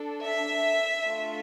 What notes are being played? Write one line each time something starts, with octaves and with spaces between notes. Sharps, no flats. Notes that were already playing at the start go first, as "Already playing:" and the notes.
Already playing: D4 A4
E5
A3 D4 F4 A4